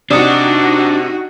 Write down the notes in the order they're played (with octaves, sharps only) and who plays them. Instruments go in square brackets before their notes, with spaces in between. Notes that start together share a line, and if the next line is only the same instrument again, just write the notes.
[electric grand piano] C3 [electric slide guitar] D4 [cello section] D#4 F#4 [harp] D5 D#6 C#7